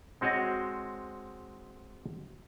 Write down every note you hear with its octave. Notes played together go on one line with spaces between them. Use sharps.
G#3 C4 F#4 C#5 D#5